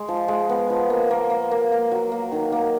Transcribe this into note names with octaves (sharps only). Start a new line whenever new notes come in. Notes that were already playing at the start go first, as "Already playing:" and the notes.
Already playing: G#3
F3
G#3
B3
F3
A#3
A#3
A#3
A#3
A#3
F#3
A#3
D#3
A#3